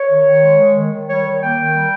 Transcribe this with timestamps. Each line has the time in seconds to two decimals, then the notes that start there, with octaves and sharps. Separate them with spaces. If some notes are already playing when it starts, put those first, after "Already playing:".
Already playing: C#5
0.09 D#3
0.25 D#3
0.42 G#3
0.58 G#3
0.75 D#3
0.92 D#3
1.08 G3 C#5
1.24 D#3
1.40 A#3 G5
1.57 D#3
1.74 G3